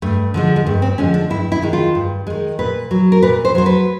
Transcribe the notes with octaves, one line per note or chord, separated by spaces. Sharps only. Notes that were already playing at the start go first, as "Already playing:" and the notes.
G2 A3
D3 F3 G#3
G#3
G2 A3
C4
D3 F3 G#3 C#4
D4
G2 E4
E4
D#3 G#3
F4
G2
D#3 G#3
A#2 B4
F#3
A#4
A#2 B4
C5
F#3 C5
B4